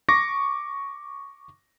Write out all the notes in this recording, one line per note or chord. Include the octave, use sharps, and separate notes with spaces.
C#6 D6 A#6